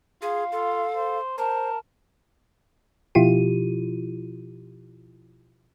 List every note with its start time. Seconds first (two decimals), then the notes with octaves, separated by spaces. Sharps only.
0.22 F4 G#4 F5
0.52 F4 A4
0.95 C5
1.38 A#4 C5 A5
3.15 B2 F3 E4 F4 G4 D#7